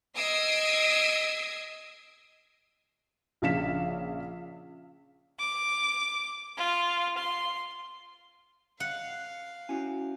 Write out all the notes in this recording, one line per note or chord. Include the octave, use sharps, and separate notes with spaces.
D#5 D#6 E6 G#6 C7 D7
A#1 C#3 F5 B6 E7
D6
F4
C6
F5 F#5
C#4 E4 F#4 G#5